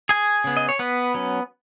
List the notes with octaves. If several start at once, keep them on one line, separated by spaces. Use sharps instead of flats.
G#4 G#5
C#3 B3
D#5
C#5
B3 B4
F#3 C#4